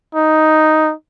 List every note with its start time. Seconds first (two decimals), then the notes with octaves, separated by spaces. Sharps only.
0.15 D#4